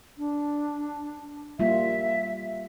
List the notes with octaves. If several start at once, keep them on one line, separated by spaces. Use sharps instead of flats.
D4
G3 A#3 F4 E5